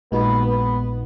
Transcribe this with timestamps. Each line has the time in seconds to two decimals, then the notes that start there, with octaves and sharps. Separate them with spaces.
0.12 A#1 A#2 G#3 B3 D#4 F#4
0.47 B3